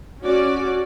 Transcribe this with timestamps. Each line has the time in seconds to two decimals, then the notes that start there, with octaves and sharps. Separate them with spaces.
0.22 C#4 F#4 D5